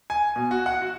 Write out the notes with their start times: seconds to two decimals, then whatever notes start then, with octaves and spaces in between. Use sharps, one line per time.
0.10 G#5
0.36 B2
0.51 F#4
0.66 F#5
0.82 F#4